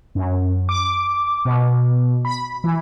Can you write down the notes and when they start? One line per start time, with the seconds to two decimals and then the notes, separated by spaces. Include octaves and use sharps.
0.15 F#2
0.69 D6
1.45 B2
2.25 B5
2.64 E3